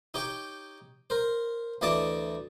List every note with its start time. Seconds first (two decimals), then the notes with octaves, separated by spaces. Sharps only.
0.14 D#4 G4 C#5 G5
1.10 A#4 C5
1.81 D2 E3 D5 D#5 A5 D6